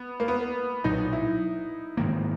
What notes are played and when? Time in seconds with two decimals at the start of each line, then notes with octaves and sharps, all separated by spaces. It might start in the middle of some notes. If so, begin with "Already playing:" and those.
Already playing: B3
0.20 A#3
0.28 B3
0.84 B1 A#2 F#3 D#4
1.13 E4
1.97 G#2 D#3 A#3